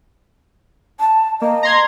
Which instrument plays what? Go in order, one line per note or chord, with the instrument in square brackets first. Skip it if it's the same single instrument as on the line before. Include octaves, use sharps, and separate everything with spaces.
[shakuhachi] A5
[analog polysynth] A#3 [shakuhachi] D#5
[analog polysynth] A#5 C6 G#6